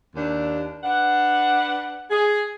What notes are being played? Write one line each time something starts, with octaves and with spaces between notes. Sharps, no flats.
D#2 D4
D4 B4 F#5
G#4